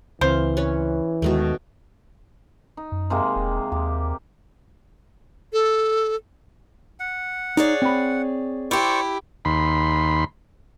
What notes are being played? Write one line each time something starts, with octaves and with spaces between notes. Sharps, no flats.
C#2 E3 C4 C5 F5
C#4 B4 C#5
D#2 B2 D#3 G#3 A3
D#4
F#2
C3 G#3 A#3
E1
D#2 G4
A4
F#5
D#4 G#4 C#5 D5
C4 B5
E4 G4 C5 D5 C#6
D#2 B5 C6